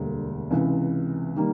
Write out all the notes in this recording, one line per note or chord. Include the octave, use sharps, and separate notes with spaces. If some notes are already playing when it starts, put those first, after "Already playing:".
Already playing: E1 D2 D3 G3 A#3
C#2 C3 E3
D#3 G3 A#3